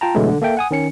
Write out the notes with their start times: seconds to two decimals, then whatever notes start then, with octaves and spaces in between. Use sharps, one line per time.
0.01 F4 G5 A5 A#5
0.15 B2 D3 E3 F#3 G#3 A3
0.28 D3
0.42 A#3 A4 E5 G5
0.57 F#5 G#5 D#6
0.71 D#3 C#4 C#7